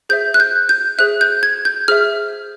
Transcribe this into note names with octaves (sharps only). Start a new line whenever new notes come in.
G#4 C5 E5 G6
F#6
G6
G6
G#4 C5 E5 F#6
G6
G#6
G6
G#4 C5 E5 F6